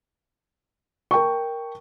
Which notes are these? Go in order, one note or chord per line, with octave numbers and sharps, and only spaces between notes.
A#4 G5 A5 C#6